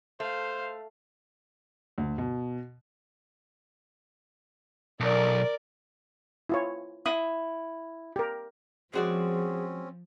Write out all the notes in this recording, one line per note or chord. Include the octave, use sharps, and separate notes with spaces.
A3 C5 F5
D2
B2
B1 A#4 D5
E4 F4 C#5
E4 D#6
G4 A#4
F3 G#3 C4 C#4 F#4 G#4 D5